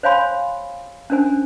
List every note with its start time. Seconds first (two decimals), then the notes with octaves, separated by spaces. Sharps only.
0.03 C5 C#5 F5 G#5 B5 C6
1.10 C#4 D4 A#4 C5 G#5